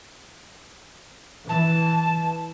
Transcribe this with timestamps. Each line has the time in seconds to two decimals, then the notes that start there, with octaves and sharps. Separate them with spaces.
1.49 E3 A5